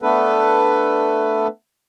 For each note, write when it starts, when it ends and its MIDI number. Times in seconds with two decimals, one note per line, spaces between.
0.02 1.47 57
0.02 1.47 59
0.02 1.47 62
0.02 1.47 69
0.02 1.47 71